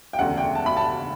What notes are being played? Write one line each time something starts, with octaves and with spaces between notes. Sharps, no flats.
G5
E1 D2 C#3 F#5
G5
A5
B5
A5